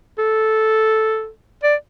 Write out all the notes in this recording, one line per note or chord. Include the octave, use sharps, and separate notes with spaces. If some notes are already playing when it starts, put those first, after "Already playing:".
A4
D5